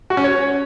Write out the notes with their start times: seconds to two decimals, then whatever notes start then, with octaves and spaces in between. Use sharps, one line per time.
0.10 F#4
0.17 C#4
0.24 C#5